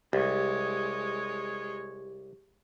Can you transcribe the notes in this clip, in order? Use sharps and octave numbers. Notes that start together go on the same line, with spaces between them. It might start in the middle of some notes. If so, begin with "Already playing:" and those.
C2 G#3 G4 C#5